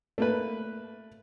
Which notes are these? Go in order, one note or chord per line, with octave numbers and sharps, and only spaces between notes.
A3 A#3 B4